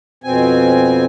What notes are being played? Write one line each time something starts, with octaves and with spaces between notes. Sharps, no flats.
F2 B2 C4 G#5